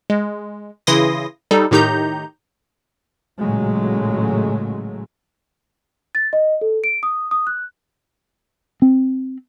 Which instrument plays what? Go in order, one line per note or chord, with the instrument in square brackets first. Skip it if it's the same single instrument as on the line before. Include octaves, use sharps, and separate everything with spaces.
[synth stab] G#3
C#3 E3 E4 C6 D#6 A#6
G3 D#4 A4
A2 D#3 D#4 G4 A#5 G6
[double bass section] A1 A#2 C#3 F#3 G#3 A3
[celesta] A6
D#5
A4
D7
D#6
D#6
F#6
[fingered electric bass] C4